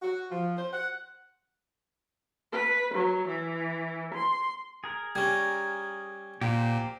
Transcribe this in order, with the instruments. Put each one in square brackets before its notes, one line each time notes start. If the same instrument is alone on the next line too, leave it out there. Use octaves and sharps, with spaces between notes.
[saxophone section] F#4
F3
C5
F#5
[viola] B4
F#3
E3
C6
[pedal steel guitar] G#4 A#4
[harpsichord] G3 C#4 [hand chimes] G#6
[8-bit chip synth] A#2 [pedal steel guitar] G4 A#4 C5